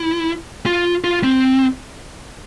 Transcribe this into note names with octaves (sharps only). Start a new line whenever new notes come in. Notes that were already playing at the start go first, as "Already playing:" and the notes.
Already playing: E4
F4
F4
C4